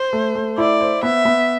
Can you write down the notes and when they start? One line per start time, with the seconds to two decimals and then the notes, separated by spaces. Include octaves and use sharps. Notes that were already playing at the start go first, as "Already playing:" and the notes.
Already playing: C5
0.13 A3
0.35 A3
0.58 E4 D5
0.81 C5
1.03 B3 E5
1.25 B3